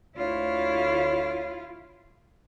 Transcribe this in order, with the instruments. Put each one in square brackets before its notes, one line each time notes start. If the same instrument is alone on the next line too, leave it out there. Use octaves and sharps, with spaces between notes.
[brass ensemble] D2 C#5 [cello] E4 F4